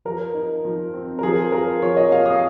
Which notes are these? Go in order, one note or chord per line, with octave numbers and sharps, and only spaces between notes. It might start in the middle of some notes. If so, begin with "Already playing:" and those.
F3 A#4
D#4
F3
C4
A#4
F3 G#4
F4 A#4
F3 C#5
D#5
A#3 F5
D#6